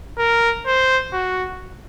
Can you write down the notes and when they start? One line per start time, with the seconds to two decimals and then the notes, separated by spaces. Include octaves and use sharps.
0.18 A#4
0.66 C5
1.13 F#4